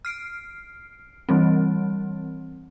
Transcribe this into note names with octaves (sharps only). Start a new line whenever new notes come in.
F6 C7 D7
E3 G3 C4